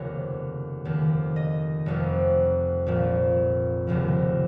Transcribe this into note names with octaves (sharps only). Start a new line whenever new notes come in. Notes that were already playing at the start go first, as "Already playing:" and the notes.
Already playing: F1 D#2 C#3 C#5
F1 D#2 D#3
D#5
F1 F2 F3
A#1 A#2 F3
F1 D#2 C#3 F3